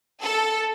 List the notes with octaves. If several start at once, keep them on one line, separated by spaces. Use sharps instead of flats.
A4